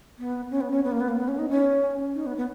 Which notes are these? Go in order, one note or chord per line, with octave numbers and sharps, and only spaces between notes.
B3
C#4
B3
C#4
B3
A#3
B3
A#3
B3
C#4
D#4
C#4
D#4
B3
B3